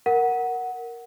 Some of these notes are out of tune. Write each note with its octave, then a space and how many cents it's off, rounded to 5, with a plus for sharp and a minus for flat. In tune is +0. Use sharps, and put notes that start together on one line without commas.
A#4 +0 F#5 +0